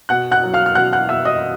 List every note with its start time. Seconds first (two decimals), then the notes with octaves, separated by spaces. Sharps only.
0.09 B2 F#5 F#6
0.31 F#5 F#6
0.43 F#3
0.54 F5 F6
0.66 F6
0.75 B2 F#5 F#6
0.92 F#5 F#6
1.09 B2 E5 E6
1.25 D#5 D#6